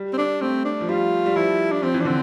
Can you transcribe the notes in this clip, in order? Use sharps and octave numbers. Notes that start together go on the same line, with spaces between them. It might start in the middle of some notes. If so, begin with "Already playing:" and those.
Already playing: G3
C4
D4
A3 C4
D4
F3
G3 F4
G3
F3 E4
D4
F3 C4
E3
D4
D3 C4